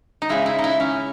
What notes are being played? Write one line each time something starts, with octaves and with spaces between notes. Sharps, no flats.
D#4
C#3 G#3 E4
E4
D#4
E4
C#4